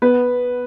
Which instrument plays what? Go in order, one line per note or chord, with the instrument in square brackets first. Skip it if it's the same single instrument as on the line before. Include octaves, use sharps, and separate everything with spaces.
[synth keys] B3 [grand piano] B4